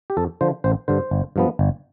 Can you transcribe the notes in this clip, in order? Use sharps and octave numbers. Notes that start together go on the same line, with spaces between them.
G4
F2 A4
D3 F3 C5
A1 C5
G2 D3 C5
G1
G2 F3 B3
G1